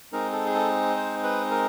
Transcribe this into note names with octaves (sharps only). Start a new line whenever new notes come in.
G#3 C4 D#4 A#4
A4
G#4
A4
C5
B4
A#4